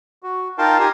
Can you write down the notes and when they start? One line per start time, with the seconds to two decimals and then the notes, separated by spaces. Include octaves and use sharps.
0.23 F#4
0.58 D#4 F4 A#4 G5 A5 C6
0.80 D#4 G4 G#5 A#5 C6